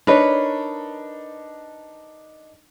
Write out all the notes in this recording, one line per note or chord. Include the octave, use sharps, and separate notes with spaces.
D4 D#4 A#4 B4 C#5